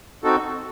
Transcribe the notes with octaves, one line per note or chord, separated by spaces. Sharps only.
C4 D#4 F#4 A4